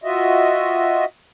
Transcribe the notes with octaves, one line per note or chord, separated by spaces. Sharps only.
F4 F#4 D#5 E5